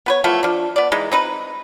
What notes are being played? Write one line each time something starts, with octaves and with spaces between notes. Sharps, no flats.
B3 B4 C#5
E3 F3 A3 B3
F3 D4
B3 D5
E3 G#3 D#4
C4 D#4 B4